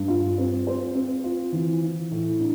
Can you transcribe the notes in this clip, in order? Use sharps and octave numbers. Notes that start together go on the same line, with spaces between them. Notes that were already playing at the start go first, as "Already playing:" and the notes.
Already playing: G2
F4
C4
C5
C4
F4
E3
E3
A2
D4